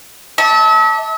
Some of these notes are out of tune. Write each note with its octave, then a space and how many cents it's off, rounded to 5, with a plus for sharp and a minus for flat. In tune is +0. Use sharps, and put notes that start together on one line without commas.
D4 +0 E5 -40